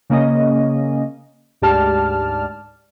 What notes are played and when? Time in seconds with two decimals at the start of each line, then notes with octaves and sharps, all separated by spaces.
0.10 C#3 A#3 C#4 D#5
1.62 D2 G#2 G4 D5 A5 F6